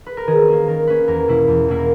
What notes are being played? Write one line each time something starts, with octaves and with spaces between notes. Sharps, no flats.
B4
A#4
D#3 G#4
A#3 C#4
D#3 A#4
A#3 C#4 B4
E2 A#4
B2 A#3 E4
E2
B2 A#3 E4
A#4